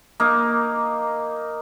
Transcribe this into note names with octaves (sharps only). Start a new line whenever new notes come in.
A#3 D#4